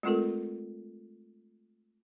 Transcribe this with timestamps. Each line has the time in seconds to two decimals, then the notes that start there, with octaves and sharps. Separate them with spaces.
0.03 G#3 A3 C4 F4 A4 A#4